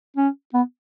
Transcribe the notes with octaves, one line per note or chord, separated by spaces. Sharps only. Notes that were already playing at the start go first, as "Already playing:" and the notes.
C#4
B3